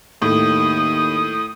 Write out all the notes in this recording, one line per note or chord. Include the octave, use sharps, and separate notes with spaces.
D#2 A2 D#6